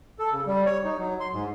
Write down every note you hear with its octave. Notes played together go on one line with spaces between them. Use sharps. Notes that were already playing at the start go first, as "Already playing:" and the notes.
A4
C#3
G3
C#5
D#4
F#3
C6
G#2